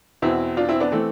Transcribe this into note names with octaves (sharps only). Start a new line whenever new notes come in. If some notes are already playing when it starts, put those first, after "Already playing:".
E2 B2 C4 E4
D4 F4
C4 E4
B3 D4
E3 A3 C4